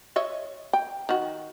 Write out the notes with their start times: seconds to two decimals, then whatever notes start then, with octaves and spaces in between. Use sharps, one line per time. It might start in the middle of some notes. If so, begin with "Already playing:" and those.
0.16 C#5 D#5 E5
0.73 G5
1.09 D#3 F#4